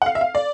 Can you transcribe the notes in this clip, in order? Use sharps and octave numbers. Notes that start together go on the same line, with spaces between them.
F#5
F5
E5
F5
D5